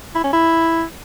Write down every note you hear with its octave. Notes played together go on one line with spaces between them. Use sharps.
E4
C#4
E4